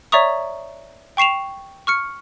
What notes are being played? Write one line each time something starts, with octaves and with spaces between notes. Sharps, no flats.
C#5 D5 E5 A#5 C#6 D#6
G5 C#6 C7 E7 F7
C#6 F6 C#7